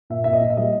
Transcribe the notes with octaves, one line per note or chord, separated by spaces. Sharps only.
A#2 E5
A#2 E5
D#5
A#2
E5
G3 D#5